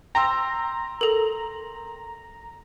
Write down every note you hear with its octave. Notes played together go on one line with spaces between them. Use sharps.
G5 A#5 C6 E6
A4 A#4